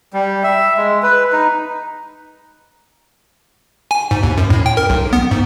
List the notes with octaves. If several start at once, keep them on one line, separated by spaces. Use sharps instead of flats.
G3
E5
G#3
B4
D#4
G#5
G#2
D#2
F#2
A2
G5
A#4
B1
B3
G#2